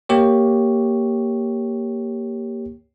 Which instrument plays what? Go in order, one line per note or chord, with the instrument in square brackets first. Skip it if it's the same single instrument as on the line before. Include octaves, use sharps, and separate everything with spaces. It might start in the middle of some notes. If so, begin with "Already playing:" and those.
[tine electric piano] A#3 G4 C#5